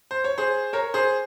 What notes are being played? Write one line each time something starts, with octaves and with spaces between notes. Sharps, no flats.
C5
C#5
G#4 C5
A#4 C#5
G#4 C5